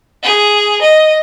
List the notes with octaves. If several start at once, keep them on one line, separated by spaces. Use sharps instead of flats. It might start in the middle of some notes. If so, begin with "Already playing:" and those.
G#4
D#5